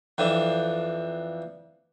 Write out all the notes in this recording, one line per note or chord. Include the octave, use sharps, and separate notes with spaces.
F2 E3 D4